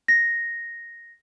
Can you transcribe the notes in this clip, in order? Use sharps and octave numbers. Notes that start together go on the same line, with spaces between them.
A#6